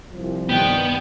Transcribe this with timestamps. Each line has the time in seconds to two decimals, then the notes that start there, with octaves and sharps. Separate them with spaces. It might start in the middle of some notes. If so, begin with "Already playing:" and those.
0.12 C2 F3
0.49 G2 C3 D#3 B3 G5